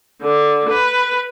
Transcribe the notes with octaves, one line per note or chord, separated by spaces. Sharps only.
D3
B4